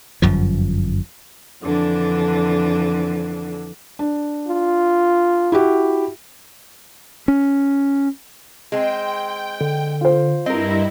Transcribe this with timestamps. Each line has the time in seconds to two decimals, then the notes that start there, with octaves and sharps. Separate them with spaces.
0.22 G1 F#2 F3
1.61 F2 D3 E3 D4
3.99 D4
4.48 F4
5.52 E4 F#4 G4
7.28 C#4
8.72 G#3 C4 G5
9.61 D3
10.01 F4 C5
10.46 G2 C4 E4 A#4 D#5